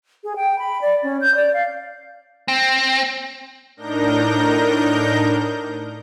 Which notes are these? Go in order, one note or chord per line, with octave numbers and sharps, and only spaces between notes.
G#4
G5
B5
D5
C#4
G6
D5
F5
C4
A2 D4 D#4 A#4 G6 A#6